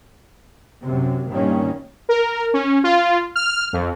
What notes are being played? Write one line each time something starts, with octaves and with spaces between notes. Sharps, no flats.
F#2 C3
G2 A#2 D#3 A#3 C#4
A#4
C#4
F4
F6
F2